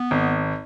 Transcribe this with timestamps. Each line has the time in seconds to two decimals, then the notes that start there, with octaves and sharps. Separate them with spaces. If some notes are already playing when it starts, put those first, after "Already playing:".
Already playing: B3
0.11 G#1